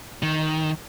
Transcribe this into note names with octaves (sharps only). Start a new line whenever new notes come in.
D#3